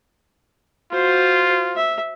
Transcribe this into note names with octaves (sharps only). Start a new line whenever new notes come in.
F4 F#4 C5
E5